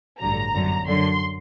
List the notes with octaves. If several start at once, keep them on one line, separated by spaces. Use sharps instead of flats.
A1 G2 D3 F#3 A#5
G1 F#2 D3 F#3
F#2 D3 F#3 C6